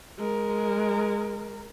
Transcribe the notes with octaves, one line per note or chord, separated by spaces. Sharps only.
G#3 A#4